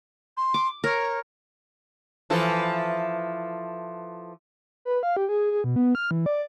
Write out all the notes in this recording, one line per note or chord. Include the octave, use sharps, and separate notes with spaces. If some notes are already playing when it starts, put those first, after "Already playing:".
C6
D6
A#4 C#5
E3 F3 A4
B4
F5
G4
G#4
G#4
B2
B3
F6
E3
D5